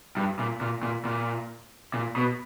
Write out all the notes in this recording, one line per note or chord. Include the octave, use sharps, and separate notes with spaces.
G2
A#2
A#2
A#2
A#2
A#2
B2